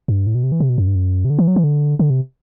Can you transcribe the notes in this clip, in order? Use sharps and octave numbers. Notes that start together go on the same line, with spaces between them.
G2
A2
B2
C3
E3
C3
B2
F#2
G2
F#2
C3
D3
E3
F#3
E3
D3
D3
C3